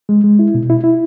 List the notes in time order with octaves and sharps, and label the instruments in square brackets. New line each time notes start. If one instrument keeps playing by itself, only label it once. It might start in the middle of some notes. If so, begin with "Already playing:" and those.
[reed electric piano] G#3
G#3
E4
B2
E4
E4